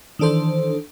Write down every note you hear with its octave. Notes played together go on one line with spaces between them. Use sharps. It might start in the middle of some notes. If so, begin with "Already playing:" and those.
D#3 E3 D4 A4 C5